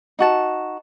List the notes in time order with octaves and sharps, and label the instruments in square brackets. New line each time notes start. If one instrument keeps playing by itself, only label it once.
[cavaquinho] D#4 F#4 A5